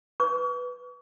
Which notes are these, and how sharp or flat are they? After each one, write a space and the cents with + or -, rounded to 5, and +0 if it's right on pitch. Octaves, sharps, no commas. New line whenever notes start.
B4 +0 C#6 +40